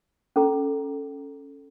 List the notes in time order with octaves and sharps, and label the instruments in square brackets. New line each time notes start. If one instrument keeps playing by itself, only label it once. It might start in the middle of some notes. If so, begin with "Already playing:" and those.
[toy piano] C#4 A4 A#5